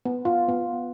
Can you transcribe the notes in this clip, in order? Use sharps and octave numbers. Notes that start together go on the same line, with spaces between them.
B3
F4
B3